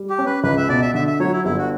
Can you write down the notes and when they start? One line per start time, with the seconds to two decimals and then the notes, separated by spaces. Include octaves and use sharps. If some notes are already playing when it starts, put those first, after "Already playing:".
Already playing: G3
0.10 G4
0.18 C#4
0.26 B4
0.44 C#2 B4
0.57 E5
0.69 B2 D5
0.82 E5
0.94 D3 E5
1.07 E5
1.20 F#3 C#5
1.33 E4
1.45 G1 E4
1.58 F#4